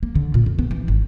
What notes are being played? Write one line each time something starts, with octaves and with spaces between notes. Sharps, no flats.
A#3
D3
A#2
F2
B3
E3
G#1